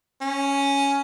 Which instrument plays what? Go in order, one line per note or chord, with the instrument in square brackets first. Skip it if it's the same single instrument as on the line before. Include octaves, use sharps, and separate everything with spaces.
[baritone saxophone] C#4